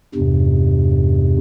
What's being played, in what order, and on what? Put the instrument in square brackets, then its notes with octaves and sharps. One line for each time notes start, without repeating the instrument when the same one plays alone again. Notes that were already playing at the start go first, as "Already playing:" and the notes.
[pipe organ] E2 G2 C3